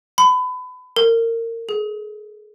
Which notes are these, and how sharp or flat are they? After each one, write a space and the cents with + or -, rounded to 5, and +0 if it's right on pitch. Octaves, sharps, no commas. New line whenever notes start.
B5 +30
A#4 -25
G#4 +25